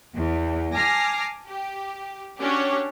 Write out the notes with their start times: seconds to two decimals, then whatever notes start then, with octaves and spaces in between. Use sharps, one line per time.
0.15 E2
0.74 G#5 A5 D6 F6 A#6 C7
1.49 G4
2.40 C#4 D4 F#4 G4 C#5